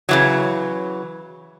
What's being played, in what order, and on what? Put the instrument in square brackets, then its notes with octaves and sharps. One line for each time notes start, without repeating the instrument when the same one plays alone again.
[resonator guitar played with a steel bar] C#3 E3 F#3